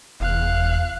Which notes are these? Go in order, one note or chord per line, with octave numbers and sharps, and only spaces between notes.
F1 E2 F5 F#6